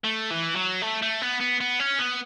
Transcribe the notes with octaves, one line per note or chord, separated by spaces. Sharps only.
A3
E3
F#3
A3
A3
B3
B3
B3
C#4
B3